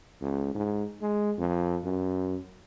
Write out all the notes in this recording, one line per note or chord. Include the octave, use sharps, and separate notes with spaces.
C#2
G#2
G#3
F2
F#2